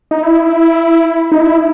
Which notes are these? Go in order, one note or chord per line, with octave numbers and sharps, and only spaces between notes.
D#4
E4
D#4
E4